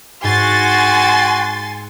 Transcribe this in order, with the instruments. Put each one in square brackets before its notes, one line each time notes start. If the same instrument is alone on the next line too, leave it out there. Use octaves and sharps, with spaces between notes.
[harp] G#2 [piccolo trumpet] F#4 [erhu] G#5 [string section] C6 A6